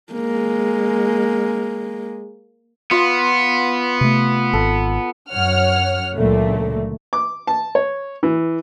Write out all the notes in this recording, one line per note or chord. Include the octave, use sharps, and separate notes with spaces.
G#3 A#3
B3 F4
C3 A3
G#1 A4
F#2 C#5 F#5 F6
C#2 A#2 D3 F#3 A3
D6
A5
C#5
E3